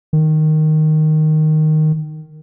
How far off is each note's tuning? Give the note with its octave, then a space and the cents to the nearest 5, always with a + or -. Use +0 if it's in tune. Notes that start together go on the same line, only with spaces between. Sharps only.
D#3 -5